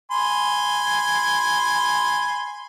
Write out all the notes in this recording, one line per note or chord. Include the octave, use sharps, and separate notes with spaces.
G#5 B5 C6